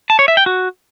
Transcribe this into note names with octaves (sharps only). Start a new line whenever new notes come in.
A5
C#5
E5
G5
F#4